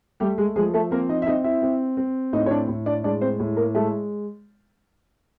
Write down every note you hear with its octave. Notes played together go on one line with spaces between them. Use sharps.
G3 A3 G4
G#3 G#4
F3 G#3 G#4
A3 A4
A#3 C4 A#4
D#4 D#5
E5
C4 D#4 D#5
E4 E5
C4
C4
A2 D#4 D#5
C#5
D4 D5
A2
D4 D5
G#3 D4 D5
C4 C5
A2
A#3 A#4
G#3 A3 A4